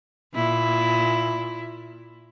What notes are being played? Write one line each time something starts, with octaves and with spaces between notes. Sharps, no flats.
A#2 E4